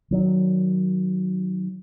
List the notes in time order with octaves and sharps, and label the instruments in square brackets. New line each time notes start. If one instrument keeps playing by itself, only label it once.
[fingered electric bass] D#3 F#3